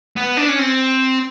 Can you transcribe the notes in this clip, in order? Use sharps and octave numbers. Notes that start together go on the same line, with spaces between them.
B3
D4
C#4
C4